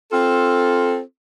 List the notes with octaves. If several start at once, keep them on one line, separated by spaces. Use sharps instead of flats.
C4 F4 A4